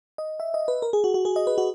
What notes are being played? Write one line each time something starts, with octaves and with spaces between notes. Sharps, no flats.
D#5
E5
D#5
B4
A#4
G#4
F#4
F#4
G#4
D#5
B4
F#4